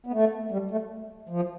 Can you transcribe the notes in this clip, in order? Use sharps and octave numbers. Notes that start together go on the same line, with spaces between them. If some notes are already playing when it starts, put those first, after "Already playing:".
B3
A3
G3
A3
F3